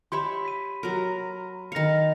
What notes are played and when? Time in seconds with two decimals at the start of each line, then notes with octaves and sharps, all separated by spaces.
0.12 G4 C#5 E5 B5 C6
0.45 B6 D#7
0.83 F#3 A#4
1.72 D#3 F5 A#6 C#7